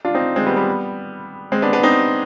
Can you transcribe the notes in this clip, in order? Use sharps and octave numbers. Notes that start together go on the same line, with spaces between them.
D4 F4
C4 D#4
G#3 C4
G3 B3
G3 B3
G#3 C4
B3 D4
B3 D4
C4 D#4